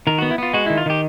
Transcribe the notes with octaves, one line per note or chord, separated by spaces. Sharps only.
D#3 A#4
B3 F#4
E4
B3 F4
G#3 F#4
D#3 E4
F4
D#3 G4